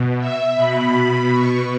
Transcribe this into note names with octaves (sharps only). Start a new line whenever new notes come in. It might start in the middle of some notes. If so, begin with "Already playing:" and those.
Already playing: B2
E5
B2 B5
C#6